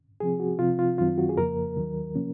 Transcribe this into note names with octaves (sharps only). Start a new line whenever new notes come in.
C3 F3 C4 G#4
F#4
C3 F3 C4 F4
F4
F#2 D#3 F#3 C4 F4
F#4
G#4
F2 C#3 F3 A#3 A#4
D#2 D#3 F#3
C3 F3 A#3 C#4